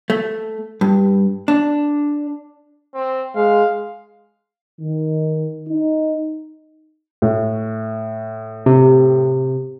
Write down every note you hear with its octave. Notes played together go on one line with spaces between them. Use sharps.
A3
G2
D4
C4
G#3 F5
D#3
D#4
A2
C3